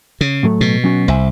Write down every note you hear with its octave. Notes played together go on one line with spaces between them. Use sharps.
C#3
A2 F#3 A3
B2
F#3 C#4 F#4
C2 C5 E5 G#5